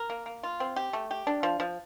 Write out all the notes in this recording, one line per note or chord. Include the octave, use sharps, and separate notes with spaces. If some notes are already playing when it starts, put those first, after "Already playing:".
Already playing: A#4
A#3
A#3
F4
C4
G4
A3
G4
D4
F3
F3